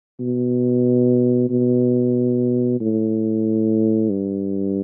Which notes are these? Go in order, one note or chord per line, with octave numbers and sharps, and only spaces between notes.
B2
B2
A2
G2